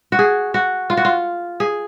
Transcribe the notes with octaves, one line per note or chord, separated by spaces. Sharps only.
F#4
G#4
F#4
F4
F#4
F4
G#4